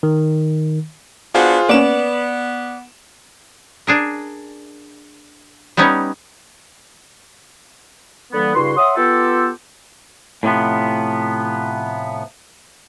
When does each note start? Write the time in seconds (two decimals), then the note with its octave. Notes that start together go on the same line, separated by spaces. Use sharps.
0.03 D#3
1.35 B3 D4 F4 F#4 G#4 C5
1.69 A#3 B3 C#4 D5 D7 E7
3.87 D4 G#4 A#4
5.77 G3 B3 C#4 D#4 C#5
8.33 D3 E3 G3 A#3 B3
8.55 G2 C#3 E4 F#4 C6
8.77 C#5 E5 F#5 C6 D#6
8.97 B3 F4 G4 A4
10.43 A2 C3 F3 B3